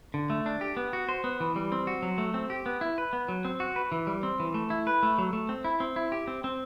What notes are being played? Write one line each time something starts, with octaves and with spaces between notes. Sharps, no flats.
D3
A3
D4
G4
B3
F#4
C5
B3
E3
G3
C4
F#4
F#3
A3
C4
G4
B3
E4
B4
B3
F#3
C4
F#4
B4
E3
G3
C4
E3
A3
E4
B4
A3
F#3
A3
C4
E4
C4
E4
G4
C4
C4